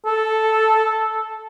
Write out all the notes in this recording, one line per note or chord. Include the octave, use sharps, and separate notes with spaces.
A4